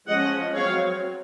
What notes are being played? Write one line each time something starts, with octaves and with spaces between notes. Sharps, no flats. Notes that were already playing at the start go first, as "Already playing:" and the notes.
F3 G#3 C#4 D#5 F#5
F#3 C4 C#5 F5